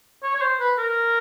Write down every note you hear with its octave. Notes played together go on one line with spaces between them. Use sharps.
C#5
C#5
C5
B4
A#4